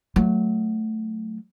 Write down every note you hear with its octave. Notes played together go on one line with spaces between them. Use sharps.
F#3 A3